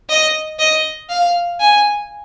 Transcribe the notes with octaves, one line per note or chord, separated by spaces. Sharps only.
D#5
D#5
F5
G#5